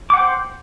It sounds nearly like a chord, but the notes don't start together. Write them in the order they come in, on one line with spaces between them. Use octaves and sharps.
D6 F#5 G5 C5